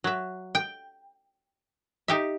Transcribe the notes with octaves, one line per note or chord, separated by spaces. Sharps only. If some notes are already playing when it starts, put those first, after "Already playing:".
F#3 E5
G5
D#4 G4 E5